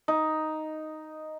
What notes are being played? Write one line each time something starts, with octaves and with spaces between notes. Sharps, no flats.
D#4